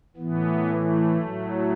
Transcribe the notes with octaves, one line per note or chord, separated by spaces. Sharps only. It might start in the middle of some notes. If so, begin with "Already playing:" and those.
A2 E3 B3
A3
A2 F#3